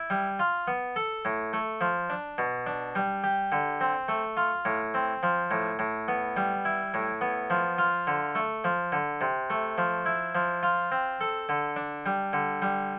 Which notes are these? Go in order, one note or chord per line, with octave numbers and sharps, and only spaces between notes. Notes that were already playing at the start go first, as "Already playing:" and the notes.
Already playing: E4
G3
F4
B3
A4
A2
A3
F3
D4
B2
D4
G3
G4
D3
C4
A3
F4
A2
C4
F3
A2
A2
B3
G3
E4
A2
B3
F3
F4
D3
A3
F3
D3
C3
A3
F3
E4
F3
F4
C4
A4
D3
D4
G3
D3
G3